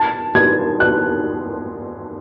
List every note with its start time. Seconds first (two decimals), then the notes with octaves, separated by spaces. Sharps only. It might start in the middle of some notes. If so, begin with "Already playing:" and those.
Already playing: A5
0.35 G#6
0.80 F#6